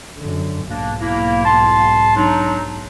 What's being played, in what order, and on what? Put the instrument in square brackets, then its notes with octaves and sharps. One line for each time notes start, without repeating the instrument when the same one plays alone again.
[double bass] F#2 D3
[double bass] B1 G#2 [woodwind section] A#3 D4
[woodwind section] A#3 E4
A5 C6
F#3 D4 D#4